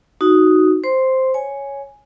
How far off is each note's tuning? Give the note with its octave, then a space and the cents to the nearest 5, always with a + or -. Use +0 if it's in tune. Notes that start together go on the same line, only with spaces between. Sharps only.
D#4 +0 F#4 +0
C5 +0 C6 +0
C#5 +0 G#5 +0